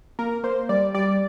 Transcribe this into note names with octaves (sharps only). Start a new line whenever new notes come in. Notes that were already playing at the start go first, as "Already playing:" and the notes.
A#3 A#4
A#3 C5
G3 D5
G3 D5